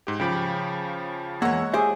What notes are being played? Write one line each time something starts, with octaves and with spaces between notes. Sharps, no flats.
G#2 G4
C#3 F3 G5 B5 D6
E2 G#3 A#3 C#5 F#5 C#6 E6
G4 G#4 C5 E5